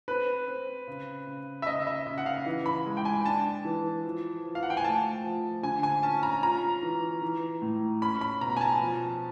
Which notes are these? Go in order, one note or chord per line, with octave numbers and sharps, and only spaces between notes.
C4 B4
C4
C#3
C#3
E5
C#3 D#5
E5
C#3
F#5
F5
E3
B5
G#3
G5
G#5
D4 A5
E3
F3
F3
F5
F#5
G5
G#5
A3 A5
F3
D3 G#5
G#5
C#4 A5
A#5
F4 A#5
E3
E3
A2
C#4 B5
B5
B2 A#5
G#5
A5
F3